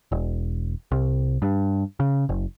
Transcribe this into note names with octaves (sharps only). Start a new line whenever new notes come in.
E1
C2
G2
C#3
F#1